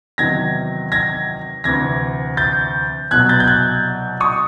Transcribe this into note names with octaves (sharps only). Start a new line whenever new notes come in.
E2 C3 D#3 F#3 G#6 A#6
G#6 A#6
D2 C3 E3 G#6 A#6
G6 A6
C2 B2 F#3 F#6 G#6
G6 A6
G6
F#6 G#6
C#6 D#6